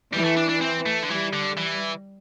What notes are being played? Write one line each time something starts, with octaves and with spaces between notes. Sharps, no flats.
E3 G3
A3
D4
D4
C4
A3
D3
E3 G3
D3
E3